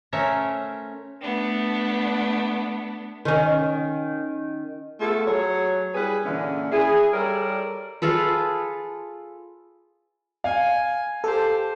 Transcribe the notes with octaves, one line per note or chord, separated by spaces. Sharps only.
A3 C#4 A#4 C5 C#5 E5
A3 B3 D4
D#3 C#4
A3 B3 F4 G#4 A4
F#3 G#4 C#5
G3 E4 G#4 B4
A#2 D3 E3 C#4
E4 G#4
G3 A4 A#4 C#5 D5
F4 G#4 A4 B4
F5 G#5
G4 A4 C5